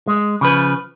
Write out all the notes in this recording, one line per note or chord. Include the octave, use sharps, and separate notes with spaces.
G#3
C#3 F3 B4